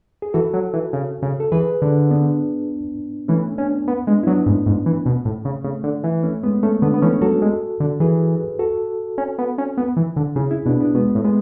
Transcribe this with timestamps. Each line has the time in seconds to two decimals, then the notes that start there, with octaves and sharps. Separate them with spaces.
0.22 G#4
0.34 E3 F#4 A4
0.54 F#3
0.73 E3
0.93 C#3
1.22 C#3
1.40 A4
1.52 E3 G#4 B4
1.82 D3
2.11 B3 D4
3.28 E3 A3 C#4
3.58 B3 C#4 D4
3.88 B3
4.07 G#3 B3 D4
4.23 E4
4.27 F#3 B3 D4
4.46 G#2 A3 C#4
4.66 G#2
4.86 E3
5.06 B2
5.25 A2
5.45 C#3
5.64 C#3 A3
5.84 D3
6.04 E3
6.23 A3 C#4
6.43 G#3 B3
6.63 A3 C#4
6.82 D3 B3 D4
6.94 B3
7.02 E3 A3 C#4
7.21 F#3 F#4 A4
7.42 G#3
7.80 D3
8.00 E3 G#4 B4
8.59 F#4 A4
9.18 C#4
9.38 B3
9.58 C#4
9.77 B3
9.97 E3
10.16 D3
10.36 C#3 E4 G#4
10.51 C#4 E4
10.66 B2 B3 D4
10.81 B3 D4
10.95 B2 G#3 B3
11.15 A2
11.25 G#3 B3